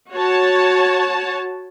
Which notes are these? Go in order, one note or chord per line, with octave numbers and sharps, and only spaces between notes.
F#4 C#5 A5